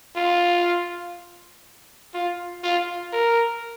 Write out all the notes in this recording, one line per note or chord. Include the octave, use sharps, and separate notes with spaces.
F4
F4
F4
A#4